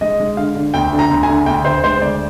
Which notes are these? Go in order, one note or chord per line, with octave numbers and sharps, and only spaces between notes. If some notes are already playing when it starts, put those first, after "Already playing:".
G#3 D#5
G#3
D3 F5
D3
D2 G5
D3
A#5
D2
G#5
D3
D2 G5
D2 C5
G#3 C5
D2 D5